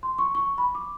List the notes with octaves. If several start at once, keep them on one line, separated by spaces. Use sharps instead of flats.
C6
C#6
C#6
B5
D6